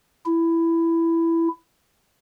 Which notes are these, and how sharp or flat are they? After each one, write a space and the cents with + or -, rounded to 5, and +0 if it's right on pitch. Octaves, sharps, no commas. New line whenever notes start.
E4 +10